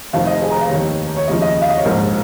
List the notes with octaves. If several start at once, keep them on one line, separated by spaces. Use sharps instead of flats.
F1 F2 D#3 F5
D#5
G#4
A#5
F5
D#2 D#3 C#5
C#5
D#2 C#3 F3 D#5
D#5
F5
D#5
C#5
A#1 G#2 F3 A#4